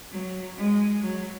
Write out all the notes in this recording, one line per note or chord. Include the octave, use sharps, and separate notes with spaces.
F#3
G#3
F#3